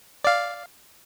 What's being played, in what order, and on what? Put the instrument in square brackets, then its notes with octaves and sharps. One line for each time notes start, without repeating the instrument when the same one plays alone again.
[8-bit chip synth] D5 F5